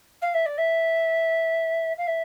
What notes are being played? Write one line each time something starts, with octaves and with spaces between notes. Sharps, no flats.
F5
E5
D5
E5
F5
E5